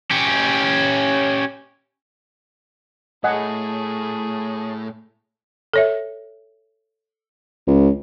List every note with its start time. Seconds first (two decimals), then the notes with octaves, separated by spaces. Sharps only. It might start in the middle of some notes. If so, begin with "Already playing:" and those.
0.11 C#4 G4
3.24 A2 A3 G#4 D#5 F#5 G#5
5.73 A4 C#5 E5
7.67 C#2